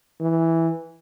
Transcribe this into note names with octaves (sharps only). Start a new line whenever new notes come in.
E3